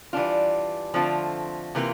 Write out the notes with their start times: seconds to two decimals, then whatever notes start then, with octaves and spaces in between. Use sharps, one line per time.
0.13 E3 G3 D4 F4
0.94 D3 F3 A3 C4 F4
1.75 C3 E3 A#3 F4